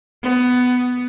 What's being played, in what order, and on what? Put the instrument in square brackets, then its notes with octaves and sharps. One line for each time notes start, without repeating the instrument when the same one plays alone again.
[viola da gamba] B3